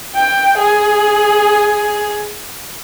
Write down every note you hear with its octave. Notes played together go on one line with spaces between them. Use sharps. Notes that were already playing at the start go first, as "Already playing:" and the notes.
G5
G#4